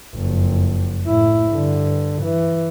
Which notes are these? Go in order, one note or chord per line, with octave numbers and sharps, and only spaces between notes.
F#1 F2
A2 E4
G2 D3
E3